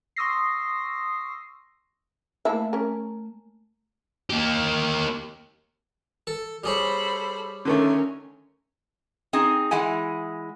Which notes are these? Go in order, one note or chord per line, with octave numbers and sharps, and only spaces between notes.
C6 C#6 D#6 E6 A#6 C7
A3 A#3 E4 E5 A5
C#4 A#4
A#3 G4
A4
G3 G#4 A4 C5 C#5 B5
D3 D#3 A3 C#4 A#4
C4 D#4 G#4
E3 G#3 E4 F#5 G#5